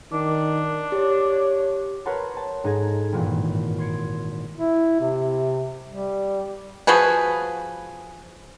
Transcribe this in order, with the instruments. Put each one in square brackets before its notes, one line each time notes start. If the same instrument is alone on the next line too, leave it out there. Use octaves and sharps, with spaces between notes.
[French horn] D#3 [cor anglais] D4
[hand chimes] G4 [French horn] C#5
[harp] A#4 B4 C#5 F#5 A5 C6
C5 A5
G#2 D#4 G#4 A4 G#6 A#6
G#1 G2 A#2 E3
C6 G#6 C#7 D7
[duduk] E4
C3
G3
[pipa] F3 F#4 G#4 B4